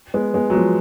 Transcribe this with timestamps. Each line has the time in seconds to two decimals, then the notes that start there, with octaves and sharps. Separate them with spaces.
0.14 G#3 B3
0.34 G#3 B3
0.50 F#3
0.55 F3 G#3